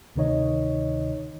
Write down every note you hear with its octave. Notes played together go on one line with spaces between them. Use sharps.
D2 C3 D#3 D#4 C#5 D#5